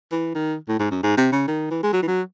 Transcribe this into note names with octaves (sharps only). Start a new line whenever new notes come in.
E3
D#3
A2
G#2
F#2
G#2
C3
C#3
D#3
E3
G#3
F#3
E3
F#3